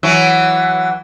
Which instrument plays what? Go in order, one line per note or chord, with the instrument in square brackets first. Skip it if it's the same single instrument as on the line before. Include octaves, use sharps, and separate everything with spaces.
[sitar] E3 F#3